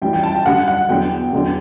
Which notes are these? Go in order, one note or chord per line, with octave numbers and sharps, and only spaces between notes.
F#2 E3 G3 G5
G5
A5
G5
F#2 D3 G3 F#5
F#5
E2 D3 F#3 G5
E2 D3 F#3